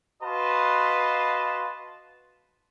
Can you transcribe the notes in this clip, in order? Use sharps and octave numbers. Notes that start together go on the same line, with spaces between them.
F#4 B4 D#5 F5 A5 C6